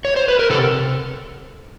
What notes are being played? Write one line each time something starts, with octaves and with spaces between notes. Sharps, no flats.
C#5
C5
B4
A#4
C3 A4